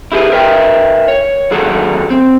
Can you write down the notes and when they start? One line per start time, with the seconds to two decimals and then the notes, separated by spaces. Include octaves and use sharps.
0.12 E4 G4 G#4 B4
0.32 A#4 B4 E5 G5
1.08 C#5
1.51 D#2 D3 F#3 G#4 A4 F#5
2.10 C4